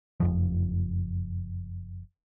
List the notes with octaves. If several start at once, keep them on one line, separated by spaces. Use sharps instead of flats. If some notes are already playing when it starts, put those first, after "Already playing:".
F#1 F2 F3